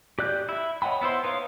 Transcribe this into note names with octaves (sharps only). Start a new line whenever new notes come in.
G4 D5 F#6 G6
E4 E5
C#5 D#5 F#5 G5 B5
B3 E4 C5 C6
D#4 B4 C#5 F5